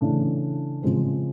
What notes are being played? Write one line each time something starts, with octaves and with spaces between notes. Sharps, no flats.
C#3 E3 A3 D4
C#3 F3 G#3 C4